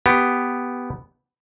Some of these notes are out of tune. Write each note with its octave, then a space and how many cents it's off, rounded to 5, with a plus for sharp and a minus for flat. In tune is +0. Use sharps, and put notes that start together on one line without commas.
B3 +0 G4 +0